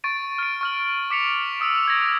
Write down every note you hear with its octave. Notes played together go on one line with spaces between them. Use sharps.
C#6 A6 D7 D#7
F6 D7
C#6 F6 F#7
D6 B6 C#7 F7
C#6 D#6 E6 D7
G#6 A#6